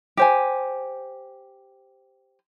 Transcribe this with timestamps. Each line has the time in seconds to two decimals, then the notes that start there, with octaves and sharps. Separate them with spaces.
0.17 G4 C5 G#5